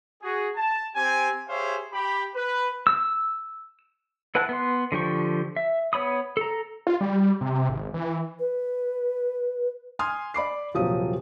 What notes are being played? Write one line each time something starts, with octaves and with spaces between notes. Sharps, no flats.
F#4 G#4
A5
C4 G4 G#5
G4 G#4 C5 C#5 E5 F5
G4 B5
B4
E6
E4 B4 F#5 A5 F#6
B3 C6
D3 F3 G4 C#6
E5
B3 C#5 B5 D#6
A4 A#5
F4
G3
C3
G#1
E3
B4
G#5 C6 D#6 F6
D5 B5 D6 C7
D#1 C3 F3 F#3 D#6